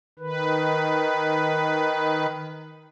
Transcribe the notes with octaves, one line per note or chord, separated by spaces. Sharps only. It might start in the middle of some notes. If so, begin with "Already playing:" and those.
D#3 B4